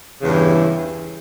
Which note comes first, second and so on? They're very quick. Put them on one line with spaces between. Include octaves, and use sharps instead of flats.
C#3 E2 G2 E3